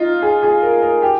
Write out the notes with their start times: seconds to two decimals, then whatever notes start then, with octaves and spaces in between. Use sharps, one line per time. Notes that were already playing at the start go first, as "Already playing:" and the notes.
Already playing: D#4 F4
0.22 G#4
0.43 G#4
0.62 A#4
0.82 A#4
1.02 G4